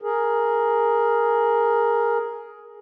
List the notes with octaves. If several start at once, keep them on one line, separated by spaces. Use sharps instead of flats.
G#4 A#4